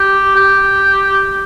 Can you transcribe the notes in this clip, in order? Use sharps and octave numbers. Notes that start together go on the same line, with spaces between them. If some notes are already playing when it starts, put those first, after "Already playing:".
Already playing: G4
G4